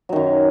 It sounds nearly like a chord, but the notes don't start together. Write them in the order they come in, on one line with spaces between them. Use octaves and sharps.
F#3 D#3 F#2